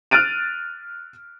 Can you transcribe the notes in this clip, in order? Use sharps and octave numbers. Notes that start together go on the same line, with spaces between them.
F6 F#6 A6 D7 D#7